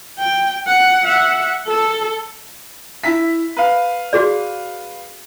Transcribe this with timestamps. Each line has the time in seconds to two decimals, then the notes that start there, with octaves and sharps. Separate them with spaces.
0.19 G5
0.67 F#5
1.04 E5 F#5
1.67 A4
3.04 E4 E5 B6
3.57 B4 F5
4.13 F#4 G#4 D5